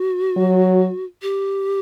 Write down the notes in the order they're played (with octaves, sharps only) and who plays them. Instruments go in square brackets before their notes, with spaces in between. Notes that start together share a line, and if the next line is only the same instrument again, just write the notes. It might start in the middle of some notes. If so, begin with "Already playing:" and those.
Already playing: [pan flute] F#4
[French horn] F#3
[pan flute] G4